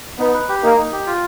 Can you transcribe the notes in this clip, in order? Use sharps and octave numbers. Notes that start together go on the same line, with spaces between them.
B3 D#4
B4
G4
A#3 D#4
D#4
G4
F4